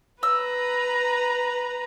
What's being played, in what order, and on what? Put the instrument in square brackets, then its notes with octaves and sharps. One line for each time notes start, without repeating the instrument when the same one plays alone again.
[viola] B4 A#5 [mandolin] E6